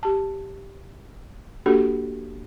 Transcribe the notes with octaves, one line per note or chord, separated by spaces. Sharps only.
G4 A5
A#3 D4 F#4 G4 A4